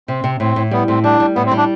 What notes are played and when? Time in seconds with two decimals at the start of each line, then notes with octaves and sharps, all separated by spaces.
0.08 C3 C4
0.24 C3
0.40 A2 C4
0.56 A2
0.71 G3 B3
0.88 A2 C4
1.04 G3 D4
1.20 G3
1.35 A2 B3
1.46 C4
1.51 G3
1.57 D4